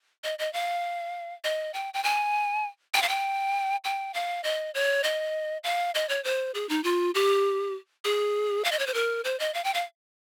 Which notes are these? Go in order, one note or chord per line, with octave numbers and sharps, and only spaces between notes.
D#5
D#5
F5
D#5
G5
G5
G#5
G5
F5
G5
G5
F5
D#5
C#5
D#5
F5
D#5
C#5
C5
G#4
D#4
F4
G4
G#4
F5
D#5
C#5
C5
A#4
C5
D#5
F5
G5
F5